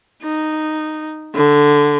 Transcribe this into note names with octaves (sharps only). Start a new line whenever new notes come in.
D#4
D3